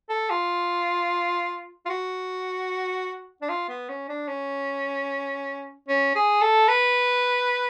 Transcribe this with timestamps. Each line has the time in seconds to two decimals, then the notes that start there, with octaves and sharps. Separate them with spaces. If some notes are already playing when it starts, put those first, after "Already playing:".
0.10 A4
0.30 F4
1.86 F4
1.90 F#4
3.42 D4
3.49 F4
3.69 B3
3.89 C#4
4.09 D4
4.28 C#4
5.89 C#4
6.15 G#4
6.42 A4
6.68 B4